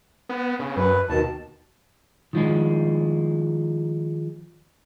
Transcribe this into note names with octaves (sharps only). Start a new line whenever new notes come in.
B3
C#3
F#2 B4
D#2 B2 D#3 A5
D#3 F3 G#3